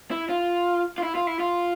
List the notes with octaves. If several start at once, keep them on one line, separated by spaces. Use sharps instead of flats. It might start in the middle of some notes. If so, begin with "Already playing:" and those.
E4
F4
F4
E4
F4
E4
F4